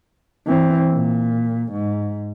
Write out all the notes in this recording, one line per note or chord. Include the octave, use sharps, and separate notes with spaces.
E3 C4
A#2
G#2